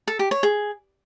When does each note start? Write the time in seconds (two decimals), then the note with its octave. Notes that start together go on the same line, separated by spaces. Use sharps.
0.08 A4
0.19 G4
0.31 C#5
0.43 G#4